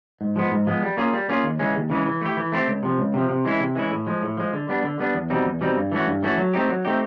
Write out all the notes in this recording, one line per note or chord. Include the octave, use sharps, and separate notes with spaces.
G#2
F3 G#3 B3
G#2
F3 G#3 B3
G3
A#3 C#4 F4 G#4
G3
A#3 C#4 F4 G#4
D#2
C#3 E3 G#3 C#4
D#2
C#3 E3 G#3 C#4
E3
A3 C4 E4 G4
E3
A3 C4 E4 G4
C#2
C3 F3
C#2
C3 F3
C3
E3 G#3 C#4 E4
C3
E3 G#3 C#4 E4
A2
F3 G#3
A2
F3 G#3
D3
G3 B3 D4
D3
G3 B3 D4
E2
B2 G3 C4 D#4
E2
B2 G3 C4 D#4
G2
E3 A3 C#4 F#4
G2
E3 A3 C#4 F#4
F#3
A3 C4 D#4 G4
F#3
A3 C4 D#4 G4